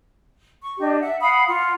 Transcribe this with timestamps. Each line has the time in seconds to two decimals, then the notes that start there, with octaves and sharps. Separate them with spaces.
0.63 C#6
0.79 D4 G4 D#5
1.00 E5 F#5
1.21 F5 F#5 B5 D#6
1.47 F4 F#5